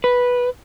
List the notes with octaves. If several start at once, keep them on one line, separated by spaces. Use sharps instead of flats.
B4